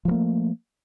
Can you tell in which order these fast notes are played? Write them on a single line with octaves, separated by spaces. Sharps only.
F3 F#3 A#3 A3